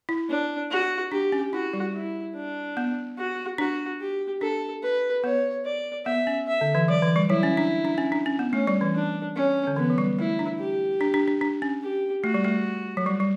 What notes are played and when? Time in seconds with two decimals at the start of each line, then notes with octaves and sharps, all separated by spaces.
0.09 E4
0.29 D4
0.71 F#4
1.12 D4 G4
1.32 C#4
1.53 E4 F#4
1.73 G3
1.94 E4
2.35 D4
2.77 B3
3.18 F#4
3.58 D4 F#4
4.00 G4
4.41 D4 A4
4.83 B4
5.24 B3 C#5
5.65 D5
6.06 B3 E5
6.27 C#4
6.48 E5
6.61 D3
6.75 E3
6.88 F#3 D5
7.02 E3
7.16 G3
7.29 F#3 E4
7.43 C#4
7.57 D4
7.85 D4
7.98 C#4
8.12 D4
8.26 C#4
8.39 B3
8.53 A3 C#4
8.67 G3
8.81 E3
8.95 D4
9.36 C#4
9.67 D3
9.76 E3 B3
9.90 F#3
9.98 G3
10.19 A3 E4
10.39 D4
10.59 G4
11.01 D4
11.14 D4
11.28 D4
11.41 D4
11.62 C#4
11.82 G4
12.24 A3 F#4
12.34 G3
12.44 A3
12.97 F#3
13.06 G3
13.20 G3